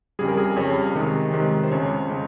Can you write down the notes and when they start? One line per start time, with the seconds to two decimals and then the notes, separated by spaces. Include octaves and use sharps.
0.19 F2 C#3 G3 G#4
0.28 A#4
0.37 G#4
0.56 F2 C#3 G3 C#5
0.95 C3 D#3 G#3
1.33 C3 D#3 G#3
1.63 C5
1.71 F2 C#3 G#3 C#5
2.09 C#3 G#3